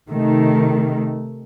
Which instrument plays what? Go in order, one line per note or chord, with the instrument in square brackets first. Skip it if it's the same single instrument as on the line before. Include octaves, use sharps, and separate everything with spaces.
[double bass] C3 A3 [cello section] D#3